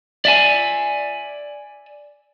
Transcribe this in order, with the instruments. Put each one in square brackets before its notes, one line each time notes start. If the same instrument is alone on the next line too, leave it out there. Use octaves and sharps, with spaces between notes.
[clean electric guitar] D5 E5 G#5